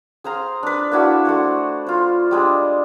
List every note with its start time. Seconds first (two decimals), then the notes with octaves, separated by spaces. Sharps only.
0.24 G#4 C5 F5 A#5
0.63 D4 B4
0.92 A#3 D4 E4 F#4
1.25 A3 F#4 C5
1.87 F4 C5
2.31 G3 G#3 D4